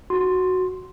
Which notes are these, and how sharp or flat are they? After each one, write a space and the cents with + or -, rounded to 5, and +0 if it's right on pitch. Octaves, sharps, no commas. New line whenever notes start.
F#4 +0 C6 +0